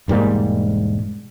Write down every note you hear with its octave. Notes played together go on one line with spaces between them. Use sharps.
E1 G#2 G3 A#3